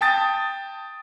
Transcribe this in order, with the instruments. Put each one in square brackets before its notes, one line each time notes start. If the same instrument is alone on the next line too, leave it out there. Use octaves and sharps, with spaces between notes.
[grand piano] G5 A5 D#6 A6